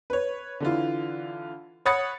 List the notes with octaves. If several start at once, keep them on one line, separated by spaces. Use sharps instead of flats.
B4 C#5
D3 E3 F4
C#5 F#5 B5 D#6 A6 C#7